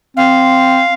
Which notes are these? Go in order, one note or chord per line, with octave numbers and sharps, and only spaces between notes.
C4 F5